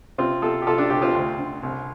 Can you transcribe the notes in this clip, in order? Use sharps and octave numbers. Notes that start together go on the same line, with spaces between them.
C3 C4 F4
C3 F4 A4
G4
C3 F4 A4
D4 G4
C2 D4 G4
C4 F4
D2
D3
C2